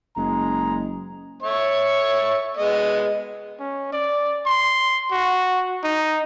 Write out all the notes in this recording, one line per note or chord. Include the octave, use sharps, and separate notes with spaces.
F#1 G#3 A#5
C#5 E5 C#6
G#3 B3 D#5
C#4
D5
C6
F#4
D#4